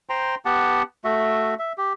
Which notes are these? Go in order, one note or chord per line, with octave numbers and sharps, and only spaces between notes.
C5 G5 A#5 C6
B3 G4 F#5 A5
A3 F#4 E5
E5
G4